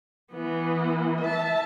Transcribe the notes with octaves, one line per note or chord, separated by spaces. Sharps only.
E3 B3
E5 A5